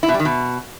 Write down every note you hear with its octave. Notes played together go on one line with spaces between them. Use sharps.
E4
B2
G3
D#3
B2